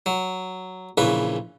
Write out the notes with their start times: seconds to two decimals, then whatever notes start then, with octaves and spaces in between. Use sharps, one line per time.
0.06 F#3
0.98 A#1 C#3 E3 B4